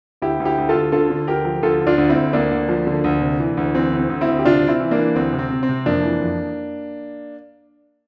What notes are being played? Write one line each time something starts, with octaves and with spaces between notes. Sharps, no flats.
D2 E4 G4
D2
E4 G4
D2
F4 A4
D2
D3 F4 A4
D3
D2 G4 A#4
F3
D2 F4 A4
D2
D4 F4
D2
C4 E4
D2
D2 A#3 D4
D2
F3
D3
D2
C3
E3
D2
E3 C4
D2
C4
D2
C4 E4
D2
G4
C3 D4 F4
C3
C4 E4
E3
A#3 D4
E3
D2 C4
C3
C4
C3
C4
C3
F2 A#3 D4
E3
F2